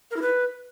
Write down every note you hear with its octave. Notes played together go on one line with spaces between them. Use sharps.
A#4
E4
B4